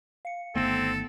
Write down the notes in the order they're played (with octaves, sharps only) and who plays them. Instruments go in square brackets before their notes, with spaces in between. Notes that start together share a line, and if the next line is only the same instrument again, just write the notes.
[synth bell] F5 C#7
[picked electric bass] G1 D#3 A3 [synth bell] B3 [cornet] C4 [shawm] A4